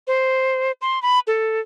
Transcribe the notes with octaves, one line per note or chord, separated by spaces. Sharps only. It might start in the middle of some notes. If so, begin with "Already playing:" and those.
C5
C6
B5
A4